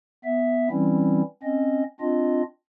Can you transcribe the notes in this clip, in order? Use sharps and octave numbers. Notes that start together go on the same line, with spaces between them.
B3 E5
E3 G3 C4 C#4 E4
C4 C#4 D#5
C4 D4 F4 D#5